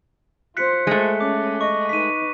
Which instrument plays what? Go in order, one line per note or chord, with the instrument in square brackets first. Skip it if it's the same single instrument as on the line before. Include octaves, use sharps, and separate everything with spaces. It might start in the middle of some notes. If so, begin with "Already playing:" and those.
[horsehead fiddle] F4 C5 [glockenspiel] F#6 B6 C#7
[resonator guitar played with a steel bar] G#3 A3
[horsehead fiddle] C#4 [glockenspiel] D6
[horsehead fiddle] D#5 [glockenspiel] C#6
[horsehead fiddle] D#4 B4 [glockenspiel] B6 D#7